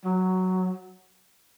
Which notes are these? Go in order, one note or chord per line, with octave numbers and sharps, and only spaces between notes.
F#3